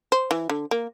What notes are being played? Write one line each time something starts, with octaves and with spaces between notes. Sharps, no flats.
C5
E3
D3
A#3